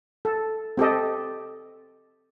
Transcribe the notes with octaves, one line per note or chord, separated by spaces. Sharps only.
A4
C4 G4 A4 D#5